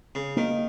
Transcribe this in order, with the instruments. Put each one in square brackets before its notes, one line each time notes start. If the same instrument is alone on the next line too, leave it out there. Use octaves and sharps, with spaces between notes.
[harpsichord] C#3
[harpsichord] D#3 [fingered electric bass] A#3